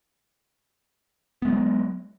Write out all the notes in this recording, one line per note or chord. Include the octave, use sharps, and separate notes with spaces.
F#3 G#3 B3